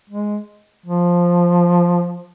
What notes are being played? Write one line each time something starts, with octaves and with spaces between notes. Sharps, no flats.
G#3
F3